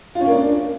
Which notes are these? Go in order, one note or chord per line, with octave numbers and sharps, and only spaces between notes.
F4
C#4
A#3
D4